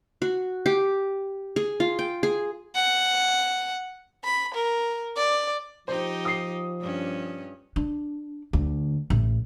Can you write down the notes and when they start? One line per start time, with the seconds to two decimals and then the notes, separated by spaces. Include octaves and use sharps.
0.22 F#4
0.66 G4
1.56 G#4
1.80 F4
1.99 G5
2.23 G#4
2.75 F#5
4.24 B5
4.55 A#4
5.17 D5
5.88 F3 D#4 G4 C5
6.25 D#6 C7
6.81 G2 C#4
7.76 D4
8.53 D2
9.10 A1